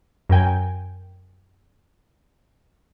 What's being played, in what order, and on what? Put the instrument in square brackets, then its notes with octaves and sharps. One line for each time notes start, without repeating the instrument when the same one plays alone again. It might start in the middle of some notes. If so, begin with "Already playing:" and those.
[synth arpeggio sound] F#2 A#4 G5 G#5